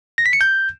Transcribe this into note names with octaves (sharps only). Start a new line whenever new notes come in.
A#6
B6
C#7
G6